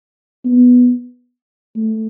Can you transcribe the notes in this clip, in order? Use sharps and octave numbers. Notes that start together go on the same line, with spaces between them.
B3
A3